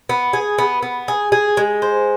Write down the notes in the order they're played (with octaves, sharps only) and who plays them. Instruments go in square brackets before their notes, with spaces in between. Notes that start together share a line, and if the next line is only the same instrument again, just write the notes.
[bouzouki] B3
G#4
B3
B3
G#4
G#4
G#3
C5